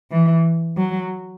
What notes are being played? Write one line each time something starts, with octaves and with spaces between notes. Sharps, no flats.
E3
F#3